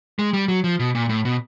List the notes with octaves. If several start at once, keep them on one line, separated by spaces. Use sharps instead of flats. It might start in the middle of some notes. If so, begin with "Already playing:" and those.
G#3
G3
F#3
F3
B2
A#2
A2
B2